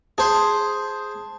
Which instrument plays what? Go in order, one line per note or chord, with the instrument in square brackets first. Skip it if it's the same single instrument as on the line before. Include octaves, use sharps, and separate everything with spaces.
[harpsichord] G#4 C5 [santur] A5